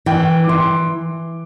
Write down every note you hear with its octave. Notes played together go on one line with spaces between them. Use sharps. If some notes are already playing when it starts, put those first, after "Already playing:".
E3 G5
D6
E3 C6